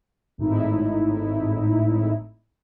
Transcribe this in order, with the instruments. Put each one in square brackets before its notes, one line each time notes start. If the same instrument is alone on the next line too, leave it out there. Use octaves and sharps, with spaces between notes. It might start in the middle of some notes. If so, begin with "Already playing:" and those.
[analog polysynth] G#1 A2 D#4 E4